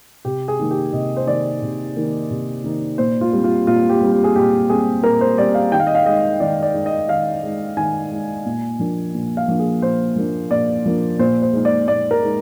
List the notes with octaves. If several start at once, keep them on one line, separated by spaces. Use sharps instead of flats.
C3 G4
G#4
D#3 A#3 D#4
G4
C3 D#5
C5
D#3 A#3 D#4 D5
C3
D#3 A#3 D#4
C3
D#3 A#3 D#4
A#2 C5
F4
G3 C4
F4
A#2 F4
G4
G3 C4
G4
G#4
A#2 G4
G3 C4 G#4
A#2 A#4
C5
G3 C4 D5
F5
D#3 G5
F5
D#5
F5
G#3 D#4 D#5
D#3 D5
D5
G#3 D#4
D#5
D#3 F5
G#3 D#4
D#3 G#5
G#3 D#4
A#2
F3 A#3 D4
A#2
F5
F3 A#3 D4
G#4
A#2 C5
F3 A#3 D4
A#2 D5
F3 A#3 D4
A#2 C5
C5
G#3 D#4
D5
A#2 D5
A#4
G#3 D#4